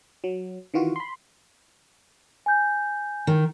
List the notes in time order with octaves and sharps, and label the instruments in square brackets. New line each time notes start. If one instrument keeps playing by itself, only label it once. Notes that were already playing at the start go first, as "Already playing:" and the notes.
[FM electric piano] F#3
D#3 E3 F4 F#4
B5 C6
[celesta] G#5 G6
[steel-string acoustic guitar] D#3